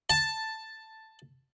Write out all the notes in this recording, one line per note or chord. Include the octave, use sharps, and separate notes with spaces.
A5